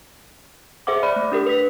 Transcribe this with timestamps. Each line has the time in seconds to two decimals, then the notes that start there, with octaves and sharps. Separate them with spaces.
0.87 G#4 C5 E5 F#5 D6
1.03 D5 B5 F6
1.16 A3
1.32 D4 G4 A#4
1.46 B4 B6